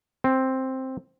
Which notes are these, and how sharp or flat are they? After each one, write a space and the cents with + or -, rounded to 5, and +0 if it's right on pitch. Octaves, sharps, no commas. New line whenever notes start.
C4 +5